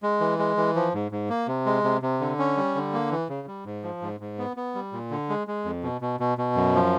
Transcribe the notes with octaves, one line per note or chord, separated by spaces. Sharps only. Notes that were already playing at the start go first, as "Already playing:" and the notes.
G#3
E3
G#3
E3
F3
G#2
G#2
A#3
C3
G#3
C3
C3
D3
C#4
G3
D3
A#3
E3
C#3
G3
G#2
F3
G#2
G#2
B3
B3
G3
A#2
D3
G#3
G#3
F2
B2
B2
B2
B2
F#2
F3